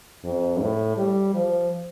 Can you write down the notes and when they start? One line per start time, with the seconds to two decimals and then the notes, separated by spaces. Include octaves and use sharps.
0.24 F2
0.61 A2
0.97 G3
1.34 F3